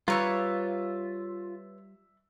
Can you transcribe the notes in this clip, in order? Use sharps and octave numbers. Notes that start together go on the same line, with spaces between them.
G3 F4 B4 C#5 D5 E5 A#5